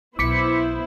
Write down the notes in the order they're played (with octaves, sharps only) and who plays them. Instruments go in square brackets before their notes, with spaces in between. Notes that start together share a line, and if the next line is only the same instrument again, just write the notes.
[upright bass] B1 [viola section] B3 E4 C5 [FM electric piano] D6 B6 C#7